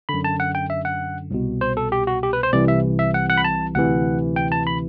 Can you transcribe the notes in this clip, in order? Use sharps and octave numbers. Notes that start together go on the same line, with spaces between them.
F#2 D3 B5
A5
F#5
G5
E5
F#5
C2 B2
C5
A4
G4
F#4
G4
B4
C5
C2 C3 E3 D5
E5
E5
F#5
F#5
B5
A5
D2 C3 E3 F#5
G5
A5
B5